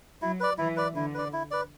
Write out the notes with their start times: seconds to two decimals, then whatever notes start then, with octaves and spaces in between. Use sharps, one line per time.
0.21 F#3 E4
0.40 B4 D5
0.58 E3 E4
0.77 B4 D5
0.95 D3 E4
1.14 B4 D5
1.33 E4
1.51 B4 D5